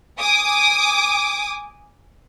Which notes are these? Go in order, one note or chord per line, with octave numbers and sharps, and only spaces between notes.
G#5 D6 D#6